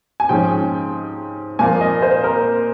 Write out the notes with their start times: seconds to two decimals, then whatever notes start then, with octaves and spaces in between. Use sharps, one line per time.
0.20 G#5
0.29 G#2 F3 G#3 C#4 G5
1.59 A#2 F3 A#3 F4 G#5
1.81 D#5
2.02 C5
2.24 A#4